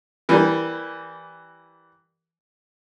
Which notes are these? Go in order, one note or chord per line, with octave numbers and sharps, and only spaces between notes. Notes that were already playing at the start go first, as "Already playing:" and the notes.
E3 G3 A#3